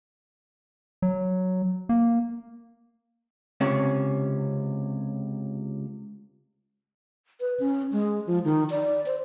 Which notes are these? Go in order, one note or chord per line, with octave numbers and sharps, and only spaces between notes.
F#3
A#3
C#2 C3 C#4
B4
C#4
G#3
F3
D#3
D5
C5